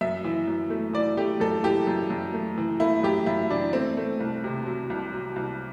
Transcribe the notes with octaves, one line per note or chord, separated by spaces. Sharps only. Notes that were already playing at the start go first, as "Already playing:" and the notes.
F#2 E5
E3
F#2
A3
E3 D5
A3 G4
F#2 A4
E3 G4
F#2
F#2
A3
E3
A3 E4
F#2 G4
F#2 E4
E3 D4
A3 C4
A3
C2
C3
F#3
C2
F#3
C2